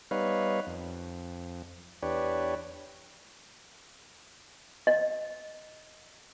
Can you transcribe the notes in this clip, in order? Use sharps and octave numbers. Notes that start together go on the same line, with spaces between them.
G3 B3 D#4 B4 C#5 F5
F2
E2 D4 G4 B4 C#5
D#5